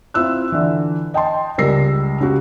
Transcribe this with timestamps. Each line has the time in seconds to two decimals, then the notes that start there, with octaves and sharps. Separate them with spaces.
0.14 C4 E4 F4 E6 F#6
0.52 D3 E3
1.14 D#5 G5 A5 C6
1.58 C#2 G3 A#4 E6 A#6 C7
2.20 C#3 F#4 G4